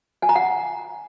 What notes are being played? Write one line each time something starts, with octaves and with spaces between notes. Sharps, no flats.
G#5
A#5
F#5